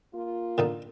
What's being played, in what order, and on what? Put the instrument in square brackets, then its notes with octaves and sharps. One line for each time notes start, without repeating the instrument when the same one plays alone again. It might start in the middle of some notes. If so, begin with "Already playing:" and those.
[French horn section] A#3 F4
[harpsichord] D3 D#3 D#4